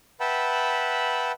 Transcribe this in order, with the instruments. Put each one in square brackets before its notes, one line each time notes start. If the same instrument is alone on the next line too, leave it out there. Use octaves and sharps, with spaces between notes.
[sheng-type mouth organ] B4 E5 F#5 G5 A5 B5